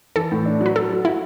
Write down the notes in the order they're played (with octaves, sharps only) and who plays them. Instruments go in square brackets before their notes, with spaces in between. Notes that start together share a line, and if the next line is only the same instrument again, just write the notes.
[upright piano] E3 [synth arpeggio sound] A4
[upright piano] A2
D4
[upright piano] F#3 [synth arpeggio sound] B4
[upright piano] F#3 [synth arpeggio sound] A4
[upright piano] F#3
[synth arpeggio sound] E4 [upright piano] F#4